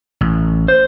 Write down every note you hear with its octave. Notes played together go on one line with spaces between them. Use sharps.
A1
C5